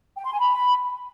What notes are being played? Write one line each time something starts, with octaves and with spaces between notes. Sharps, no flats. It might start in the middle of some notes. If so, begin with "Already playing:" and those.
G5
C6
G#5
B5